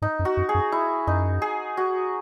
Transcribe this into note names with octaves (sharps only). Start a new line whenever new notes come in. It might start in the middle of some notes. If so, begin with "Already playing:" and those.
G#2 D#4
F#2
F#4
F#2
G#4
F#2
E4
F#2 D#4
G#4
F#4